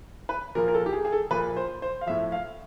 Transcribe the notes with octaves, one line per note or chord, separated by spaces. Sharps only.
B4
A#2 F3 A#4
A#4
A4
G4
G#4
G#4
A4
A#2 F3 B4
C5
C5
F5
A2 F3 E5
F5